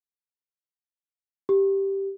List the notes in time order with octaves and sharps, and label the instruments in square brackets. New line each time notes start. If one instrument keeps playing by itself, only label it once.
[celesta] G4